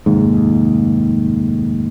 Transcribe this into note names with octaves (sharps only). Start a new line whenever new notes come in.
F1 D#2 G#2